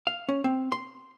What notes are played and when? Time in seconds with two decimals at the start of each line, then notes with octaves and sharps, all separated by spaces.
0.07 F5
0.29 C#4
0.44 C4
0.72 C6